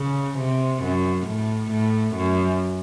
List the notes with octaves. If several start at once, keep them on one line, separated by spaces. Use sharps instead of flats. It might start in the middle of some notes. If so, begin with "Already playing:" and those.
Already playing: C#3
C3
F#2
A2
A2
F#2